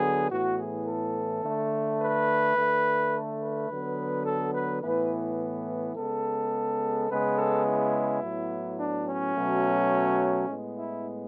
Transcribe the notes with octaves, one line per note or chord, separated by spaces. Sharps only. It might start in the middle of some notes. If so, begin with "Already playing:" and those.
Already playing: D3 F#3 B3 G#4
A2 E3 B3 F#4
G#4
A4
D3 A3
B4
D3 A3
A4
B4
D3 F#3 B3
A4
B4
A2 E3 B3 B4
C#3 G#3 B3 A4
C#3 G#3 B3 B4
A4
E4
A2 F#3 B3
D4
C#4
B2 F#3 A3
A2 G#3 B3
E4